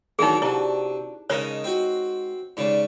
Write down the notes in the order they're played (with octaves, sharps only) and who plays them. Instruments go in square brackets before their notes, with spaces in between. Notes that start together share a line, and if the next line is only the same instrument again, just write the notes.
[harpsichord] A2 D#3 F#3 [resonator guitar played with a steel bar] E3 D4 F#4 [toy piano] D#4 G#4
[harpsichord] C3 [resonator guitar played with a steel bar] D4 F#4 [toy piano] E4
[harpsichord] C#3 A#4 A5 [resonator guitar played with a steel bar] G#3 D#4 D#5 [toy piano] C#5
[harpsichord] C4 F#4
[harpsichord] G#2 C#3 [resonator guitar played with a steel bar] G4 D5